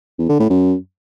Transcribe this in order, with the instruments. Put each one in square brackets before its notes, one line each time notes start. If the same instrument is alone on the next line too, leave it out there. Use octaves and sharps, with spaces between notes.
[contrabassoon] E2
D3
A2
F#2